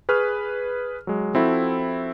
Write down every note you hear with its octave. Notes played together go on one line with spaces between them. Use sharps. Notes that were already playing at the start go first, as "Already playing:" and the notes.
G#4 B4 C#6 F6
F#3 G#3
F3 C4 E4 F#4 A4